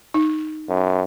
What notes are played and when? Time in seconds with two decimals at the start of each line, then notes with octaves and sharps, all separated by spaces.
0.14 D#4
0.69 F#2